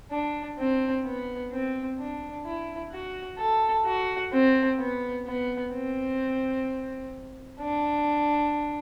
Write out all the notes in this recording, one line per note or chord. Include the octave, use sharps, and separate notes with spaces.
D4
C4
B3
C4
D4
E4
F#4
A4
F#4
C4
B3
B3
C4
D4